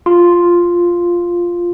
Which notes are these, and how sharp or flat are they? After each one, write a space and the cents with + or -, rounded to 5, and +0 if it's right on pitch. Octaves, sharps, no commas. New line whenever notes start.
F4 +0 C6 +0